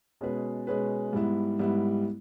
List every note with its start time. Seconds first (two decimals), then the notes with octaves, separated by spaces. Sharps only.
0.21 B2 G#3 C#4 G#4 B4
0.67 B2 G#3 C#4 G#4 B4
1.13 G#2 G3 B3 E4
1.59 G#2 G3 B3 E4